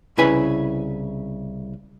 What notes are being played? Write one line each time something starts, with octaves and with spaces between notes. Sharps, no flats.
C2 C#3 E4 B4 G#5 B5